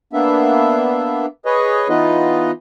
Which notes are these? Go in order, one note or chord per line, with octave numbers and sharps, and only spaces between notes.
A#3 B3 D4 E5
G#4 B4 C#5 D#5
E3 B3 D#4 F4 B4 D#5